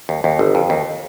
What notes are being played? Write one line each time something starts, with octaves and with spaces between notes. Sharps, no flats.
D#2
D#2
G1
F2
D#2